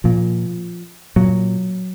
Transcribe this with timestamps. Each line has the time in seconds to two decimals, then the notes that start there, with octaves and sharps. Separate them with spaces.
0.04 A#2 F3
1.16 A#2 F#3